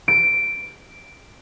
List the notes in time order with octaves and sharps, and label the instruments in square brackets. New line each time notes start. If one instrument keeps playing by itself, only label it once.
[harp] D7